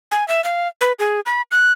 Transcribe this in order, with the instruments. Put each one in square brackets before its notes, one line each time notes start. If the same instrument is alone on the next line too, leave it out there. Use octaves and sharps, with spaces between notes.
[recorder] G#5
E5
F5
B4
G#4
B5
F#6